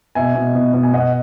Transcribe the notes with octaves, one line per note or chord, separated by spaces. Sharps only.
B2 E5 G#5
B2
B2
B2
G#5
B2 D#5 F#5